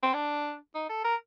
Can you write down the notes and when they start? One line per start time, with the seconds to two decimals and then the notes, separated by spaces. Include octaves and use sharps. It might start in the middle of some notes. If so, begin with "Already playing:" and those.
0.03 C4
0.14 D4
0.75 D#4
0.89 A4
1.04 A#4